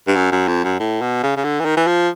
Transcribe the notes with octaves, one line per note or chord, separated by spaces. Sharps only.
G2
F#2
F#2
F2
F#2
A2
B2
C#3
C#3
D3
E3
D#3
E3
F3